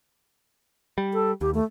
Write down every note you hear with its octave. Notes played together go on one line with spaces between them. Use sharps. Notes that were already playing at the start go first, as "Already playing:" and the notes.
G3
A4
D#2 G4
A3